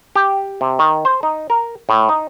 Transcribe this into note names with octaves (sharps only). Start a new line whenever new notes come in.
G4
C3
D#3
C5
D#4
A#4
A2
D#4